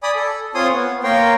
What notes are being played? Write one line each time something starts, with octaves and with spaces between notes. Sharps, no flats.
D5 G#5 B5 D#6
A4
C4 F4 C#5 G#5 C6 D#6
B3
A#3 A#4 C#5 G5 C6